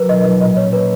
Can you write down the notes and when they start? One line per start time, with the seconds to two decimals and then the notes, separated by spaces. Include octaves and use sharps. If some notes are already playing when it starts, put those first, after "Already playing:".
Already playing: F#3 A#4 B4
0.09 B1 D#5
0.24 F3
0.41 A#2 D#5
0.57 C#4 C#5
0.73 A#3 B4